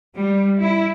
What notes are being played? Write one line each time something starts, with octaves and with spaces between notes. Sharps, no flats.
G3
E4